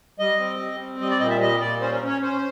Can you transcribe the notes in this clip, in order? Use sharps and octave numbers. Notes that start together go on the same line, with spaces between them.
G3 D#5
C4
G3
C4
G3 D#5
D5
A#2 D#5
E5
G3 D#5
A#2 D5
C#4 C5
A#4
C#4
C#5
C#4 C5